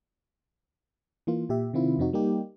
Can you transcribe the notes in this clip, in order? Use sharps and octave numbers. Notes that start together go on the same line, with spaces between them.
E3 A#3 F4
A#2 G4 E5
C3 D#3 C4 E4 F4
F2 C3 C4 D#4 F#4
G3 A#3 D#4 G4